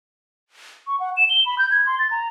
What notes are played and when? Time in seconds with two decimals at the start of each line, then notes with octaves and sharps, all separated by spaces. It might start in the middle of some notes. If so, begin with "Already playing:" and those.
0.87 C#6
1.00 F#5
1.17 E7
1.30 G7
1.46 B5
1.59 G6
1.71 G#6
1.86 C6
1.99 A6
2.11 A#5